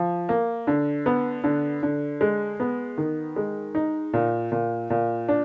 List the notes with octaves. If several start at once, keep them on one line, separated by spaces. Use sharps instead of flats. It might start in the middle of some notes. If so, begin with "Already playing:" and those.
Already playing: F3
A#3
D3
B3
D3
D3
G#3
B3
D#3
G#3
D#4
A#2
A#2
A#2
D4